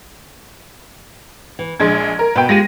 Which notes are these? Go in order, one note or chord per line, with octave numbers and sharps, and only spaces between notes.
E3
A#1 G#3 D4 G#6
A#4
B2 B4 G5
G#3 F4 G4 A#6 D#7